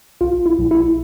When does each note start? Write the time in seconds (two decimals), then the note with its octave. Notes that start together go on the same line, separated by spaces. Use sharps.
0.21 A#1 F4
0.46 E4
0.58 A#1
0.71 E4